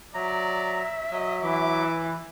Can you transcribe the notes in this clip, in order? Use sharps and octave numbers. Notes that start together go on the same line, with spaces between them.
F#3 D5 E5 A#5
F#3 D#5
E3 D6